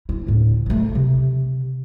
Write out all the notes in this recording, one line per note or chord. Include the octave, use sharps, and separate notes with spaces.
E4
D2 A2
D#3 A3
C3